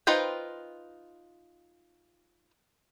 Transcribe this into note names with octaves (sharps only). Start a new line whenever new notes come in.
D#4 F4 B4 C5 G5